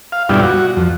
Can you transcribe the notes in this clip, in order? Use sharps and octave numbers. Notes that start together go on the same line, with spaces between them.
F5
G2 B2 G3 D4 E4 F4
F#4
F2